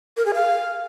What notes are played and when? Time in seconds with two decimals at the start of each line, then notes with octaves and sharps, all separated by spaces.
0.17 A#4
0.26 G#4
0.34 F5